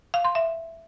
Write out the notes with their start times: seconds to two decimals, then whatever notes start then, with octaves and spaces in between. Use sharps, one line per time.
0.14 F5
0.25 C6
0.35 E5